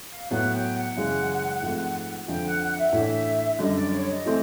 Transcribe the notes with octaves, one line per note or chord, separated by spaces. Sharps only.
F5
A2 F#3 B3 F#5
G5
F#5
F#2 C#3 E3 G#3
G#2 F3 A3 C4
F2 D3 F3 G5
F#5
F#5
E5
A2 E3 A3 D4
F#2 D3 G3 D#5
D5
C#5
D#5
E3 A3 C4